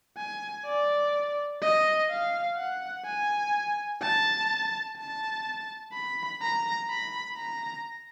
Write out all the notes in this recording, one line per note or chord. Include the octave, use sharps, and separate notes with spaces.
G#5
D5
D#5
F5
F#5
G#5
A5
A5
B5
A#5
B5
A#5